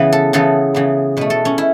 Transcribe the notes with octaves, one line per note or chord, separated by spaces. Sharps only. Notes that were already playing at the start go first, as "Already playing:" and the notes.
Already playing: C#3 E3 B3 B4
A4
C#3 E3 B3 A4
C#3 E3 B3
B2 A3 B4
A4
C#4
E4